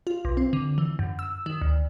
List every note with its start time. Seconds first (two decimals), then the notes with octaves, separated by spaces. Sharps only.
0.07 F4
0.25 B1
0.37 C4
0.53 D3
0.78 E3
0.99 F#2
1.19 E6
1.46 D#3
1.62 D2